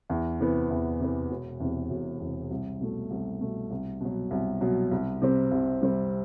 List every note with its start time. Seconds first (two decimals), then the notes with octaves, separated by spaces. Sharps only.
0.10 E2
0.40 C3 E3 B3
0.70 E2
1.00 C3 E3 B3
1.30 E1
1.60 E2 C3
1.90 E1
2.20 E2 C3
2.51 C2
2.80 B2 A3
3.11 C2
3.41 B2 A3
3.71 C2
4.01 B2 F#3
4.31 C2
4.61 B2 F#3
4.91 C2
5.22 C3 G3 C4
5.52 C2
5.81 C3 G3 C4